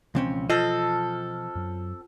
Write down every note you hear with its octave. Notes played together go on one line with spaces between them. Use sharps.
C#2 B2 E3 F3 C4 C#4
C4 F4 A4 D#5 F6
F#2 F#3